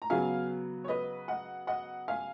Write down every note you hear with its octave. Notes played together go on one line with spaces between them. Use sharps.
A#5
C#3 F#3 B3 F5 G#5
C#5
B4 D#5
D#5 F#5
D#5 F#5
F5 G#5